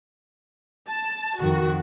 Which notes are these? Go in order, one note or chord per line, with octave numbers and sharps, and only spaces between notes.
A5
F2 D#3 F#4